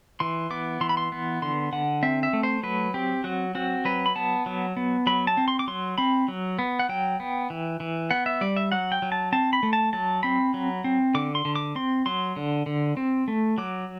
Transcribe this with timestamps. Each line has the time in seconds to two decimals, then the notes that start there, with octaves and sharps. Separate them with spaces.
0.20 E3 C6
0.50 B3 D6
0.81 E3 C6
0.89 B5
0.97 C6
1.12 B3
1.42 D3 C6
1.72 D3 F#5
2.03 C4 E5
2.23 E5
2.33 A3
2.43 C5
2.63 F#3 B4
2.94 C4 G4
3.24 F#3 F#4
3.55 C4 F#4
3.85 F#3 B4
4.06 B5
4.16 B3 A5
4.46 F#3
4.77 B3
5.07 F#3 B5
5.27 A5
5.37 C4
5.48 C6
5.59 D6
5.68 F#3 C6
5.98 C4 B5
6.28 F#3
6.59 B3
6.79 F#5
6.89 F#3 G5
7.20 B3
7.50 E3
7.80 E3
8.11 B3 F#5
8.26 E5
8.41 G3 D5
8.56 E5
8.72 F#3 F#5
8.92 G5
9.02 F#3
9.12 A5
9.32 C4 A5
9.53 B5
9.63 A3
9.73 A5
9.93 F#3 A5
10.23 C4 B5
10.54 F#3
10.84 C4
11.15 D3 D6
11.35 C6
11.45 D3
11.56 D6
11.75 C4 C6
12.06 F#3 C6
12.36 D3
12.66 D3
12.97 C4
13.28 A3
13.58 F#3 D6